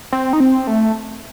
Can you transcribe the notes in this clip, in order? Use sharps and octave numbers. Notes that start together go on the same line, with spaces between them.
C4
D#4
C4
A3